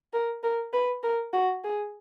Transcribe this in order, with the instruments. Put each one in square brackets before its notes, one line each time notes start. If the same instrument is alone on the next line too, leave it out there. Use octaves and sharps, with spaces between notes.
[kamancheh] A#4
A#4
B4
A#4
F#4
G#4